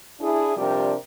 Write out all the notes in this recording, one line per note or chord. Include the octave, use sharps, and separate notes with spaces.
D4 E4 G#4
C3 F3 G3 D4 G4 A#4